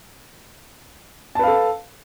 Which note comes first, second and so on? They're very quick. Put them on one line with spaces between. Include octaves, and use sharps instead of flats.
A5 B4 F5 A4